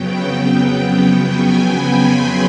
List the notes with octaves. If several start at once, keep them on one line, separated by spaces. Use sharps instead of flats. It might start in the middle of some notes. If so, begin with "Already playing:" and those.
Already playing: F2 C#3 F#3 B3 G5
G#5
B5
C6